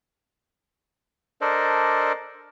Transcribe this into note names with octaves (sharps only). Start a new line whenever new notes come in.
D4 A4 A#4 C5 D5 D#5